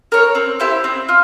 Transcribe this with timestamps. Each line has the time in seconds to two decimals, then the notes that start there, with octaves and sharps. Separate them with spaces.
0.12 A#4 C#5
0.35 C4
0.60 E4 G4 C5
0.84 C4
1.09 F4